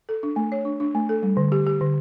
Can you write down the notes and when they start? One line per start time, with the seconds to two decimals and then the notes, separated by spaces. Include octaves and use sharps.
0.09 A4
0.23 D4
0.36 A3
0.52 C#5
0.65 D4
0.80 D4
0.95 A3
1.09 A4
1.23 G3
1.37 D3
1.52 G4
1.66 G4
1.81 D3